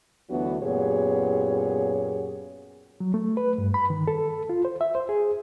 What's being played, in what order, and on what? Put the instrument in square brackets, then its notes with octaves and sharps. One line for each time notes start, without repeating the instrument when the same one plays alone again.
[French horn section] D2 E3 F#3 B3 D4 F#4
F#2 A#2 B3 G4 G#4 C#5
[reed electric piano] F#3
A3
B4
G2
B5
D#3
A4
F4
C5
E5
C5
G#4